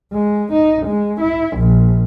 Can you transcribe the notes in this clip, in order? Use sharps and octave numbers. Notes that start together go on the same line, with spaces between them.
G#3
D#4
G#3
E4
A#1